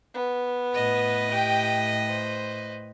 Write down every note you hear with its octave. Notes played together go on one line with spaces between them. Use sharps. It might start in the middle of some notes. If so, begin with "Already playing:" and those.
B3
A2 B4 D#5
G4 G5
C5